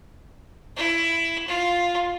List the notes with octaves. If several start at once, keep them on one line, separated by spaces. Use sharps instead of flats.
E4
F4